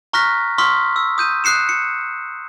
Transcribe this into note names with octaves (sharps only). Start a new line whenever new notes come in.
A#5 C#6 F6 F#6 A#6 B6
C6 C#6 D#6 F6 B6
E6
D#6 G6 D#7
D#6 F#6 C7 C#7 E7
C#7